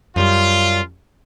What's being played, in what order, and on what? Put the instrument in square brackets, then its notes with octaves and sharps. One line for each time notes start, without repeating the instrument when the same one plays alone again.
[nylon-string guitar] F#2 G3 [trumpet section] F4